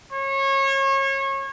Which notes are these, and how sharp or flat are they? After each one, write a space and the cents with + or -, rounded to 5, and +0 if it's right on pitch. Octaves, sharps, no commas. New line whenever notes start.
C#5 -30